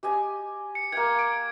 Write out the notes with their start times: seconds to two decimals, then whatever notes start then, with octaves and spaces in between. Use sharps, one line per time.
0.03 G4 D#5 G#5
0.75 C#7
0.92 A#3 G5 G#6
1.19 D7